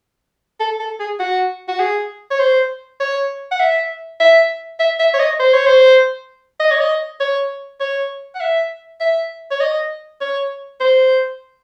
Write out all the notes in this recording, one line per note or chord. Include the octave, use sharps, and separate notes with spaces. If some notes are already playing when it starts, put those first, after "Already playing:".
A4
A4
G#4
F#4
F#4
G#4
C#5
C5
C#5
F#5
E5
E5
E5
E5
C#5
D#5
C5
C#5
C5
D#5
C#5
D#5
C#5
C#5
F#5
E5
E5
C#5
D#5
C#5
C5